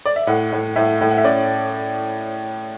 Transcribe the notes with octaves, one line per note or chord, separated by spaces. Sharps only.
D5
E5
A2 F#5
A2
A2 E5
A2
F#5
E5
C#4 D5